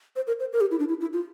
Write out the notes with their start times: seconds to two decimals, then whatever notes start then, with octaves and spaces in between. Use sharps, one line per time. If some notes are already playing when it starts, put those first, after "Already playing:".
0.16 C5
0.27 A#4
0.40 C5
0.53 A#4
0.61 G4
0.71 E4
0.79 D4
0.89 E4
1.01 E4
1.13 F4